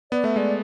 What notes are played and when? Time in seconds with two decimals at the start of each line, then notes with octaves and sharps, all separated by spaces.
0.12 B3 D5
0.24 A3 E5
0.36 G#3 D5